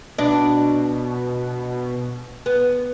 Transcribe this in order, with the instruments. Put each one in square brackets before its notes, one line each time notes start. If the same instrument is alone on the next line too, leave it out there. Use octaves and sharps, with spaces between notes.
[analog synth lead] B2 [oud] D4
[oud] B3